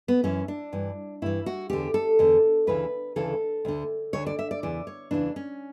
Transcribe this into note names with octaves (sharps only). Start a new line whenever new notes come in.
B3
F#2 E3 C#4
D4
G2 E3
G2 E3 E4
F#4
E2 D3 G4
A4
E2 D3
D2 C#3 E3 B4
D2 C#3 E3 A4
D2 D3
D2 D3 C#5
D5
E5
D5
E2 C#3 E3 D5
C#5
E2 C#3 E3 D4
C#4